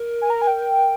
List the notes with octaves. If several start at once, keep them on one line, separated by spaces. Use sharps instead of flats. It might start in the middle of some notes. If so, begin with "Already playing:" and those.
Already playing: A#4
G#5
A#5
G#5
G5